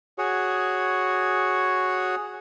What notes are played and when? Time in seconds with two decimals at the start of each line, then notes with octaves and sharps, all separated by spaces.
0.18 F#4 G#4 C#5